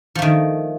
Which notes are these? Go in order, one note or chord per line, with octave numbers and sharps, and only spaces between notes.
D#3 F3 A3